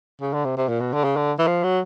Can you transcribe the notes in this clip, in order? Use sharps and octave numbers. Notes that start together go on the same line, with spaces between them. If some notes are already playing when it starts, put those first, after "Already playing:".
C#3
D3
C3
C3
A#2
B2
D3
C#3
D3
E3
F3
F#3